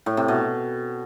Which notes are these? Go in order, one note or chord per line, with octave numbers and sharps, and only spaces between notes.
A2
C3
B2